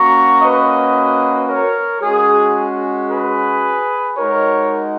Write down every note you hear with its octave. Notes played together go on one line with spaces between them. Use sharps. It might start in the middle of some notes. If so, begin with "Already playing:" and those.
Already playing: A#3 C#4 F#4 A#5 C#6
B4 D#5
A#4 C#5
G#3 C#4 F#4 G#4
G#4 B4
G#3 D#4 F#4 A#4 C#5